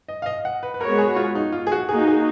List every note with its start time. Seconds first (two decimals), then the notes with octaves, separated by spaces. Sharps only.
0.08 D#5
0.22 F5
0.26 D#5
0.45 F#5
0.63 B4
0.74 B4
0.81 G#3 B3 F#4 A#4 C#5
0.98 G#4
1.16 F4
1.35 D#4
1.52 F4
1.67 G#4
1.72 F#4
1.89 A#3 D#4 F#4 G#4
2.07 G#4